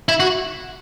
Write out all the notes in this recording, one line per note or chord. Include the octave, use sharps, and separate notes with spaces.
E4
F#4